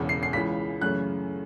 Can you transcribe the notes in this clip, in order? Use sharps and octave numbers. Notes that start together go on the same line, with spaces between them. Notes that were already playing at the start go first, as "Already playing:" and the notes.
Already playing: E1 E2 C#3 E3
C7
C7
C#2 C#3 E3 B6
F#2 C#3 E3 A3 F#6